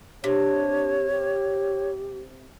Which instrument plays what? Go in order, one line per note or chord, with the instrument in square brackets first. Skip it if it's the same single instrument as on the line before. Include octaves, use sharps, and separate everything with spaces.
[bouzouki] C3 [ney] D4 [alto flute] C#5
[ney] G4